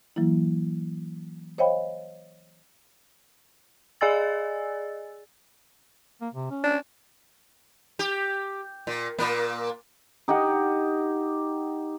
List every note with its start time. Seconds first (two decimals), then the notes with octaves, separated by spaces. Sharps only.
0.16 E3 F#3 A#3 E4
1.58 C5 C#5 D#5 F5 G5 B5
4.01 G#4 D5 D#5 G#5 E6 A6
6.21 A#3
6.34 C3
6.51 C#4
6.64 D4
7.99 G4
8.87 A#2
9.19 A#2 A#3
10.28 D#4 G4 D#5 F#5